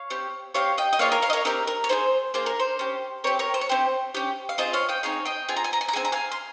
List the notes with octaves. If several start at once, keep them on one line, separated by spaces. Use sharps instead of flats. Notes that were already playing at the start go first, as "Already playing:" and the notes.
Already playing: C#5 F5
C4 G4
C4 G4 C#5 F5
D#5 G5
D#5
A#3 F4 G#4 C#5 F5
A#4 C#5
C#5 F5
D#5
A#4 C#5
C4 G4 A#4
A#4
C#5
C4 F4 G#4 C5
A#3 F4 G#4 C5
A#4
C5
C#4 G4
C4 G4 A#4 C#5
A#4 C#5
C5
C#5
C4 G4 C5
C#4 G4
F5
C4 F4 G#4 C5 D#5
C#5 F5
D#5 G5
C4 D#4 G#4 C#5 F5
D#5 G5
C4 F4 G#4 G#5
A#5
G#5
A#5
G#5
A#5
C4 D#4 G#4 G#5
A#5
F5 G#5
C6